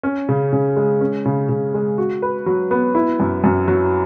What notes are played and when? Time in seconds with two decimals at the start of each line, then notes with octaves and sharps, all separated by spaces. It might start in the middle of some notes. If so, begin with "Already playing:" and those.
0.03 C#4
0.29 C#3
0.53 C#3
0.76 G#3
1.01 C#4
1.26 C#3
1.49 C#3
1.74 G#3
1.98 F#4
2.22 B4
2.46 F#3
2.71 B3
2.95 E4
3.20 F#2
3.44 F#2
3.68 F#3